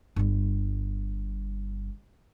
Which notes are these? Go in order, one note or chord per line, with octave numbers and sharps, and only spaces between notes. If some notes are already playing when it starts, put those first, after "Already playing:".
G1 G3